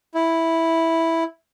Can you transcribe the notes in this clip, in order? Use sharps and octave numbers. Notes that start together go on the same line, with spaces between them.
E4